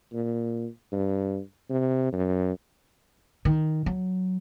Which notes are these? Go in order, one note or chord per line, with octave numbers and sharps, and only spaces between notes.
A#2
G2
C3
F#2
D#3
F#3